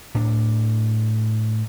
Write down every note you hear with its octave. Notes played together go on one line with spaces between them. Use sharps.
A2 D4